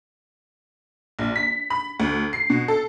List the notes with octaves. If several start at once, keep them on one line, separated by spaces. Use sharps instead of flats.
A#1
B6
B5
D2
C7
B2
A4